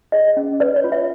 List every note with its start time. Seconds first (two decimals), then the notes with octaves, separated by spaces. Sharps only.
0.12 G#4 D#5
0.37 C#4
0.60 B4 D5
0.76 C#5
0.84 F4
0.92 E5